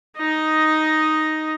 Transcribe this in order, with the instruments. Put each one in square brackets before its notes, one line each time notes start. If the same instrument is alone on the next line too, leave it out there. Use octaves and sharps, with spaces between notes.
[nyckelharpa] D#4 D#5